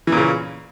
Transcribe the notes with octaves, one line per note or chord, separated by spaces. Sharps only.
A#2 C#3 E3